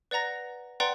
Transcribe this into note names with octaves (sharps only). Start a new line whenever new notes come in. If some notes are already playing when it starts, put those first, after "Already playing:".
B4 D5 F#5 A#5 A#6
B4 D5 F#5 G5 A#5 C6